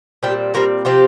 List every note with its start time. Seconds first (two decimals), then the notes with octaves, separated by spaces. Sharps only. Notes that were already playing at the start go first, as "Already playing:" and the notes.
0.23 A#2 G3 C4 G4
0.54 A#2 G3 C4 F4 A#4
0.85 C3 F3 C4 F4 G4